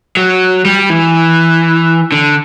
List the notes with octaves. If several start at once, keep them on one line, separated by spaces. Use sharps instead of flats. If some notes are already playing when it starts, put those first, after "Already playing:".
F#3
G3
E3
D3